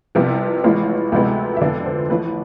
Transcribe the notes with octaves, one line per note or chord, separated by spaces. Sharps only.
C2 C3 F3 B3
A1 A2 G#3 B3 F4
D2 C3 F3 G#3 B3
E5
F2 D3 F3 B3 D5
C5
A1 A2 F3 B4